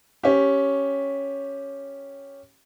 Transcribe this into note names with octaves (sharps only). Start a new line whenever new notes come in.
C#4 G4